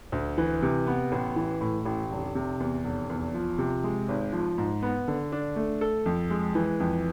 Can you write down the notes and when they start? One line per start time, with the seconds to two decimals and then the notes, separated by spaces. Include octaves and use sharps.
0.12 D2
0.38 E3
0.62 C3
0.87 B3
1.12 A1
1.36 E3
1.61 A2
1.85 A1
2.11 F1
2.35 C3
2.60 E2
2.84 F1
3.10 E2
3.34 F3
3.58 C3
3.84 G#3
4.08 G#1
4.33 F3
4.58 G#2
4.83 B3
5.08 D3
5.32 D4
5.56 A3
5.81 A4
6.06 F2
6.30 G#3
6.55 E3
6.80 F2